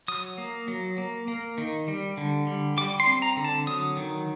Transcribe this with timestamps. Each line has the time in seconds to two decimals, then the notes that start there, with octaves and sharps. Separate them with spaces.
0.08 F#3 D#6
0.38 A#3
0.68 F#3
0.98 A#3
1.28 A#3
1.58 D#3
1.88 G3
2.17 D3
2.47 G3
2.77 G3 D6
3.00 C6
3.07 C4
3.22 A#5
3.37 D3
3.45 A5
3.67 F#3 D#6
3.97 D#3